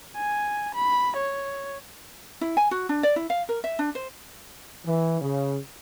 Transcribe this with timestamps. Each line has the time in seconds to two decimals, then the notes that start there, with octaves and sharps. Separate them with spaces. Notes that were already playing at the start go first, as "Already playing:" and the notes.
0.17 G#5
0.75 B5
1.17 C#5
2.41 E4
2.57 G#5
2.71 F#4
2.89 D4
3.03 D5
3.16 E4
3.30 F5
3.49 A#4
3.64 E5
3.79 D4
3.95 C5
4.85 E3
5.21 C#3